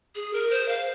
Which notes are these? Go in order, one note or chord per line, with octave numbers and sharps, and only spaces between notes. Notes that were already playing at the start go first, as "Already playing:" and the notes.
G#4
A#4
C5
F5